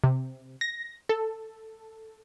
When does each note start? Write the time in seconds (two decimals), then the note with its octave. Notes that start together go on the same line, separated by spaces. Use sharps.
0.04 C3
0.61 A#6
1.09 A4